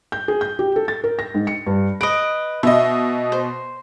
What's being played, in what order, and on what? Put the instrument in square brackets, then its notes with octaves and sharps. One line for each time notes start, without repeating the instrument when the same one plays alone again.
[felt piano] G6
G#4
G6
G4
A4
A6
A#4
A#6
G#2
C#7
G2
[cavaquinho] B4 D#5 [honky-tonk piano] D7
[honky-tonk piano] B2 D#5 [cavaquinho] E5
[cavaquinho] C5